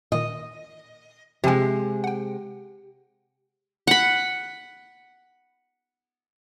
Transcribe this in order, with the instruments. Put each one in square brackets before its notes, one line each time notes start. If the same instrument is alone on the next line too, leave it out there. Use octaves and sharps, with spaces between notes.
[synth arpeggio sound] A#2 D#3 [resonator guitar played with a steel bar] D#5
[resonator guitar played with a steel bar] C3 G#3 [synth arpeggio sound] F3 G#5 [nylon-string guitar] G4
[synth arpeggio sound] F#5 G5
[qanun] F#5 B5